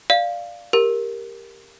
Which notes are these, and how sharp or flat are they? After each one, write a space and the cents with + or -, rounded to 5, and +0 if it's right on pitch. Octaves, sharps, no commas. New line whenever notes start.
D5 +10 F5 +0
G4 +15 A#4 +0